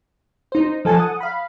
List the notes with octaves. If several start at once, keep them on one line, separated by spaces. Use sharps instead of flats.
D#4 C5
F3 A4 G#5 A5 A6
F#5 D#6
F5 B5